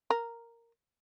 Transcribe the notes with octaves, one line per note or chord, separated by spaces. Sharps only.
A#4